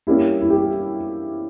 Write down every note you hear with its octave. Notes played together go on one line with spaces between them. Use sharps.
G2 G3 A#3 C#4 E4
E4
G4